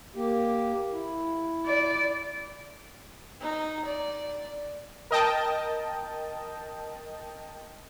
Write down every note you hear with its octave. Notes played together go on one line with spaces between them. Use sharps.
A#3 G4
E4
D5
D#4
D5
A#4 D#5 G5 A5